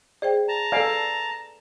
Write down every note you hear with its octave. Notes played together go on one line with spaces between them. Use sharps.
G#4 C5 D5 G5
A5 A#5
A4 B4 D5 F5 G#5